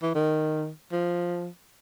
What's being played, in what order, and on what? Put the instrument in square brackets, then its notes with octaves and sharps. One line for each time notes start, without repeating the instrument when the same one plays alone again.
[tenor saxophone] E3
D#3
F3